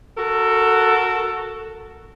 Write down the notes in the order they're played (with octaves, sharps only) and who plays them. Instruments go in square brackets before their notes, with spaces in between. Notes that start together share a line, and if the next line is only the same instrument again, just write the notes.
[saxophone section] F#4 A4 A#4